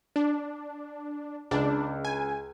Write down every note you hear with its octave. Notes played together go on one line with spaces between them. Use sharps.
D4
C#2 D4
G#5